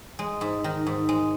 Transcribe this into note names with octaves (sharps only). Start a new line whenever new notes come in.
G#3
G#2
D#3
G#2
G#3